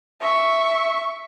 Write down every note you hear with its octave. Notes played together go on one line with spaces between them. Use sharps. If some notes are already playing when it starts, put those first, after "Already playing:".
E5 C#6